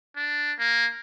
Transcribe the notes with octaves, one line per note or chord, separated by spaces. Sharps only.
D4
A#3